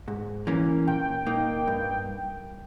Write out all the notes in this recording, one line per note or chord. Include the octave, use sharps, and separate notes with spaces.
G#2
E3 A#3 C#4
A#2 G5
A#3 D#4
G2